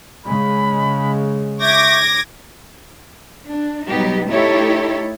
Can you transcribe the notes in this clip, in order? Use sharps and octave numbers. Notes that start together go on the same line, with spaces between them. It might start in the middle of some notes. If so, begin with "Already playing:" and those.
C#3 G#3 B5
E5 C#6 D6 G6 G#6 A#6
D4
B2 F#3 G3 B3 D#4 G4
A3 D#4 E4 G4 A4 C#5